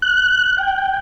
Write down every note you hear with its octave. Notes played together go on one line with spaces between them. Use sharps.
F#6
G5